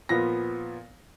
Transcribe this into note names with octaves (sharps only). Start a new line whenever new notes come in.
A#2 F3 B3 F4 A#6